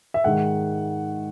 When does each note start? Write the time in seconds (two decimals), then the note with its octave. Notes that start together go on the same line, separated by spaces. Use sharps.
0.14 E5
0.24 G#2 D#3 G#3 F#5